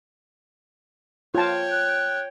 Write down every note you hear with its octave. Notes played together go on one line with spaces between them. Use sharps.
F4 C#5 G5 A5
F#6